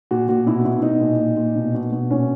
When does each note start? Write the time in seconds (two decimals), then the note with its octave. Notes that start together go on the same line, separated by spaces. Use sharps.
0.11 A#2 F#4
0.29 A#2 F#4
0.47 B2 E4
0.65 B2 E4
0.83 B2 D#4
1.01 A#2
1.19 A#2
1.37 A#2
1.56 B2
1.75 B2
1.92 B2
2.10 A#2 C#4